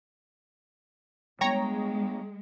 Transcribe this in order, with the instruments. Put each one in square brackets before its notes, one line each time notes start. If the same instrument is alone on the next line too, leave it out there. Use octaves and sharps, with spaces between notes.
[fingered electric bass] G3 B3 [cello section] G#3 [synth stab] C#5 A#5 [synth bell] G5